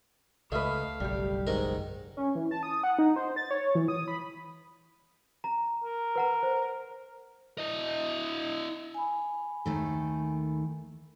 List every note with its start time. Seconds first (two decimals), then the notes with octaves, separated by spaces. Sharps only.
0.52 C#2 A3 B4 D#5 F5
1.00 F#1 B1 G3 G4
1.47 G#2 D#3 A#4
2.17 C#4
2.35 E3
2.51 A5
2.63 D#6
2.84 F#5
2.99 D#4
3.16 C5
3.36 A6
3.51 C#5
3.75 E3
3.88 D#6
4.08 B5
5.44 A#5
5.84 A#4
6.16 B4 F#5 A#5
6.43 C5
7.58 E4 D#5
8.94 G#5 B5
9.65 D#2 D#3 A3